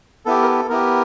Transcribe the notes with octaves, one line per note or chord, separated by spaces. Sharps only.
B3 E4 G4 A4
A#4
A4
B3 E4 G4 A#4